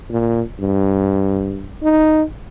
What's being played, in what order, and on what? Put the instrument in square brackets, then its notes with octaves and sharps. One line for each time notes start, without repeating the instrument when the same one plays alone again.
[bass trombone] A#2
G2
D#4